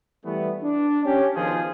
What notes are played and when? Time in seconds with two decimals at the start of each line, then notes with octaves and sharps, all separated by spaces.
0.25 E3 G3 A3 B3
0.63 D4
1.05 C#4 G4
1.36 B2 D#3 F3 F4 G#4